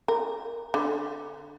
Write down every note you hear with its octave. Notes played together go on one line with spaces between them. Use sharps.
A#4
D3